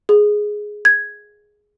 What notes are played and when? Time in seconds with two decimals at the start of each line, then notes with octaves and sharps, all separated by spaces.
0.09 G#4
0.85 G#6